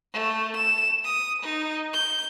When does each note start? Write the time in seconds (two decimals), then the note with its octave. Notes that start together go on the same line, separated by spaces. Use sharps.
0.13 A3
0.56 E7
1.05 D#6
1.42 D#4
1.93 G6